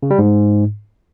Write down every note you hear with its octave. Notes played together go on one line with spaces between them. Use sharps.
C#3
G3
G#2